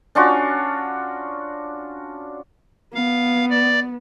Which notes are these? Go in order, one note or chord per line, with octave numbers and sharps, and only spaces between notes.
C#4 D4 F4 F#4
B3 F5
D5